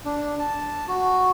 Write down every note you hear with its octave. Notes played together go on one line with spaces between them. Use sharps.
D4
A5
F#4